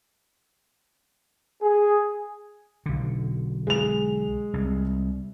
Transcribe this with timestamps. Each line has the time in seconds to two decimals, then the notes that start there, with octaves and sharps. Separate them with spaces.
1.61 G#4
2.86 B1 D3
3.67 G#3 F7
4.54 C2